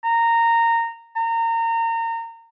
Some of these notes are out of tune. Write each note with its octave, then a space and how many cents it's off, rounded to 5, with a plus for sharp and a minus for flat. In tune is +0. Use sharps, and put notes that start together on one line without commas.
A#5 -15
A#5 -30